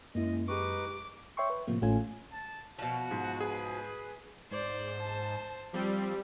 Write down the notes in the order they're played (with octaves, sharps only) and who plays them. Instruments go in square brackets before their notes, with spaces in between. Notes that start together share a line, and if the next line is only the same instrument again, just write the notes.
[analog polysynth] F#2 G#3 [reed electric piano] A#3 E4 [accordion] D#5
[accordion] D#4 B4 [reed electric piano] G4 G#4 C#6 [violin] D6
[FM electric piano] C#5 E5 G5 C6 C#6
B4
A2 C3 F3 A#3
A1 A2 A3 C#4 F4 G#5
[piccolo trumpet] A5
[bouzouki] B2 F3 [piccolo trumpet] F#4
[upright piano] G#2
[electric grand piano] G#4 [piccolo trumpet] B4
[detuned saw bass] G#2 [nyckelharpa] C5 [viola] D5
[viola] A5
[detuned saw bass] F3 [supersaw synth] G3 [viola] C4